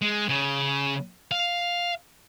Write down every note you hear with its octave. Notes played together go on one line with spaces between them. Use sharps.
G#3
C#3
F5